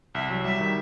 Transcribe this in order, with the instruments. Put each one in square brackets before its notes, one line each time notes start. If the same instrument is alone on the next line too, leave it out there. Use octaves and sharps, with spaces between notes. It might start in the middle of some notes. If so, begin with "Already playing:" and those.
[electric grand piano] C2 [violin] E5
[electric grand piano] F#3
[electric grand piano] G3 [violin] E5
[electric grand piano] D#3